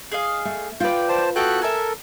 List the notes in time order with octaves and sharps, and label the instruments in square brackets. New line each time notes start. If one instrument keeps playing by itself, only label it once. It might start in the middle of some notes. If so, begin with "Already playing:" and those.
[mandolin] G#4 D#5 F5
[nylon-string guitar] A3
[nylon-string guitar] F4 B4 [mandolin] D5 G5
[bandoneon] C5 A5
[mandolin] B3 E4 G5 [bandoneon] F#4 A4 F#6
[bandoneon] A4 A#4 [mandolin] E5 G#5